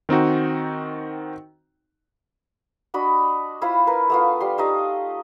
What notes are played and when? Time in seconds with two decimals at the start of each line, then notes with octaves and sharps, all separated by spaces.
0.09 D#3 C4 D#4 F#4
2.94 D4 F#4 D#5 B5
3.62 E4 F4 C5 B5
3.87 A#4 B4
4.10 A3 B3 F4
4.40 G3 C6
4.58 A3 D#4 G4 D#5